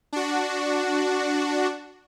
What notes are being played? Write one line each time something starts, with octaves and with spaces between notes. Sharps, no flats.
D4 F#4